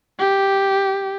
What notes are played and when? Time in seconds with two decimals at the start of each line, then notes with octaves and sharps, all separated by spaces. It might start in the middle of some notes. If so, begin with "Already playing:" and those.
0.19 G4